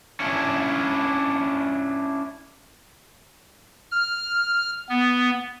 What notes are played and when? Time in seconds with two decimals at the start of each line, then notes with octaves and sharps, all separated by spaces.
0.20 C#4 D4 E4
3.92 F6
4.89 B3